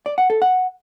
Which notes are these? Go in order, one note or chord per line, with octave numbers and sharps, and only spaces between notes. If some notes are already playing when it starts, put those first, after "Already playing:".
D5
F#5
A4
F#5